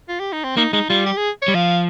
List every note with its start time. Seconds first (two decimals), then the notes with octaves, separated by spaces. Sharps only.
0.09 F4
0.20 G4
0.33 D#4
0.44 C4
0.57 A#3 D#4
0.73 G#3 D#4
0.89 G3 F4
1.06 G4
1.17 G#4
1.42 C#5
1.48 G3
1.54 F3 F5